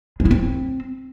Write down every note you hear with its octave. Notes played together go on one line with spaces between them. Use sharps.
G#3
E4
C4